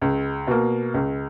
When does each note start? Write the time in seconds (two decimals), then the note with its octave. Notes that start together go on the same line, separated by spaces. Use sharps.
0.02 C#2
0.47 B2 A#3
0.94 C#2